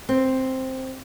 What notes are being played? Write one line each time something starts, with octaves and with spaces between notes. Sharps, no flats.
C4